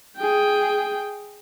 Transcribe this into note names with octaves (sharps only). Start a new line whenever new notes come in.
G#4 G5